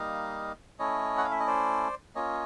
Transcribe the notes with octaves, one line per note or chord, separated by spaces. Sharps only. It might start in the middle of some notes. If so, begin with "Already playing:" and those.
Already playing: G3 A#3 D#4 D#5 F5
A3 C#4 E4 C#5 D#5
F#5
F5
E5
D#5
C5 D5
A#3 C#4 F4 C#5 D#5